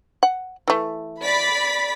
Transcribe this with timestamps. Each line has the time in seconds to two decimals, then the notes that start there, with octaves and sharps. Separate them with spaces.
0.23 F#5
0.68 E3 A3
1.21 D5 B5 B6